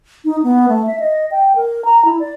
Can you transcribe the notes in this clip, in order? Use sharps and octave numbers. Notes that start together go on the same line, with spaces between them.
D#4
B3
A3
E5
D#5
G5
A#4
A#5
E4
D5